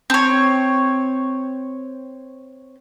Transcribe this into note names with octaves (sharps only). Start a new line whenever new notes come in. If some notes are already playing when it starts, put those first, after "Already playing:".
C4 C#5